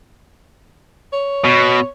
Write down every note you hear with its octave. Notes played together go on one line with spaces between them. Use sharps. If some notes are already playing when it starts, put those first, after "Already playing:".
C#5
B2